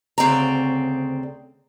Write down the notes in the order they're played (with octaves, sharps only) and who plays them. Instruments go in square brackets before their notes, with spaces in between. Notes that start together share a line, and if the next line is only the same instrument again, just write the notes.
[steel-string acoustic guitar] D2 C#3 C4 D5 A#5